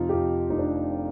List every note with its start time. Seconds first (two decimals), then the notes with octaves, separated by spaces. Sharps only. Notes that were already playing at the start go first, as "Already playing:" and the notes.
Already playing: F2 C3 D#4 F4
0.09 G4
0.13 F2 F4
0.50 F1 D#4
0.59 D4